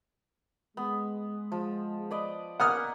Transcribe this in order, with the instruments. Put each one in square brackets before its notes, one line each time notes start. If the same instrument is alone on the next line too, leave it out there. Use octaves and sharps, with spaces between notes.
[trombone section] G#3 [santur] B3
[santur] F3
B4 D5 D#5
[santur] A#3 B3 G#5 [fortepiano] F#5 D#6 F6